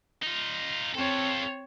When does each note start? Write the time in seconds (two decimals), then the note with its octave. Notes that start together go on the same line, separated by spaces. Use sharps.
0.22 D#4 F4
0.94 C4 F4 A4 C#5